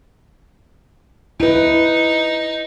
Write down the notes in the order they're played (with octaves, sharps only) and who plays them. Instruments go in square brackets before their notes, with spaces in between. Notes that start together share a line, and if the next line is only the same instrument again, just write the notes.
[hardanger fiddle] D#4 [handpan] E4 B4